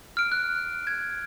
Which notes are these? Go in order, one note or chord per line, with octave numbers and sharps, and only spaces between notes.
F6 D7
F#6
G#6